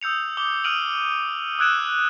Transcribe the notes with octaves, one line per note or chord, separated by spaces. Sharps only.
D#6 E6 G6 C#7 F7
D6 D#6 G7
D#6 F6 D7 D#7 F7 F#7
D#6 E6 F#6 G#6 D7 E7